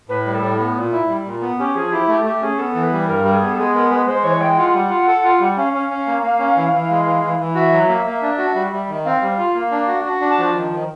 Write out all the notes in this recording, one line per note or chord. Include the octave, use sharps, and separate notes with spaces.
A2 B4
G3
A4
A2
B3
A#2
E4
G3
A#2
B3
C#4 G4
F3 G#4
E4 G4
A3 G4
A3 G4
C#4 G#4
B3 A4
E3
B4
G3
G2 A#4
G3
G#4
B3
A4
G#3 G#4
B3 A#4
G#3 B4
G#3 C5
E3 C#5
G#3 G5
F4 F#5
G3
F4
A4
F4
G3
C#4 F5
C#4
C#4
A#3
A#3
C#4
E3
E3
G#3
E3
E3
E3
F#4 E5
F#3
A#3
A#3
D4
F#4
G3
G3
D#3
C4 F5
G3
F4
A#3
D4
F#4
F#4
D4
A5
F3
D#3
D#3